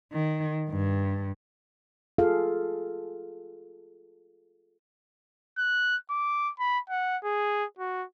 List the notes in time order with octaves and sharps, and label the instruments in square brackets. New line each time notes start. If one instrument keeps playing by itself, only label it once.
[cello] D#3
G2
[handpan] F4 G#4 A4 F5
[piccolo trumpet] F#6
D6
B5
F#5
G#4
F#4